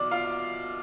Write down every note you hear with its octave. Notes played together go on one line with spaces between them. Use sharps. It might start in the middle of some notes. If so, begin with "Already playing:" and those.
Already playing: C2 B2 D5 D6
F4 F5